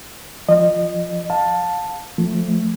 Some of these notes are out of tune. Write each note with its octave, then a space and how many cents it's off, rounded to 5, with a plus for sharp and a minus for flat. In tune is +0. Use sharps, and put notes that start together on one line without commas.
F3 +0 D#5 -25
F5 +25 A5 +5
F3 +15 A3 +0